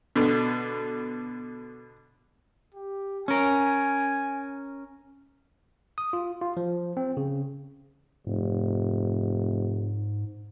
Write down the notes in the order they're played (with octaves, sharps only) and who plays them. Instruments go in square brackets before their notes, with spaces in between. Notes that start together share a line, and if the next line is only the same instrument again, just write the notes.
[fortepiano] B2 D3
[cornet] G4
[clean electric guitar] C#4 A#4 [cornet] G#5
[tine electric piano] D#6
F4
F4
F3
C4
C#3
[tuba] F1 [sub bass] G#2